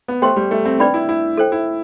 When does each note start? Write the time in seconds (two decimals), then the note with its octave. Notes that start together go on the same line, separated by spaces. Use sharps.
0.08 B3
0.22 A3 G4 C5 G5 C6
0.36 G3
0.51 A3
0.65 C4
0.79 D4 B4 D5 G5 B5
0.94 E4
1.09 E4
1.38 A4 C5 G5
1.52 E4